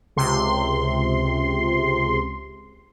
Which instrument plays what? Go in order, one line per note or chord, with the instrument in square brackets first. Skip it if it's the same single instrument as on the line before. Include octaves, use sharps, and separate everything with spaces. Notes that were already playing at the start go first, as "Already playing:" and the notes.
[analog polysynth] C#2 C3 C6